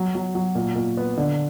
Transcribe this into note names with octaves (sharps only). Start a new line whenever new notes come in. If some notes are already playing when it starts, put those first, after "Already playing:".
Already playing: F#3
F#3
F#3
A#2
A#2
B3
D3